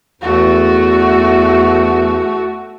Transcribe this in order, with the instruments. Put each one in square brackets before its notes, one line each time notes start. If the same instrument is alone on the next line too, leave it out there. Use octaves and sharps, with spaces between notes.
[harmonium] E2 [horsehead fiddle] A3 F#4